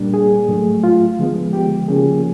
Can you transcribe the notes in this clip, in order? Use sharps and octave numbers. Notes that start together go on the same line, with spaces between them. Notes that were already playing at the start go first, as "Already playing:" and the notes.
Already playing: A#2 G3 A#3 D4
G#4
A2 F#3 A3
F4
D3 F3 G#3 B3
G4
C#3 F3 A#3 C#4 G#4